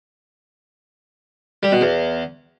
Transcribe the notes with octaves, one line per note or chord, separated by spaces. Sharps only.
G3
B2
E2